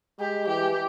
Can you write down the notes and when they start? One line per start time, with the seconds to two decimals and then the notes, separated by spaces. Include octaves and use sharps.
0.19 G#3 G4
0.47 E3 G4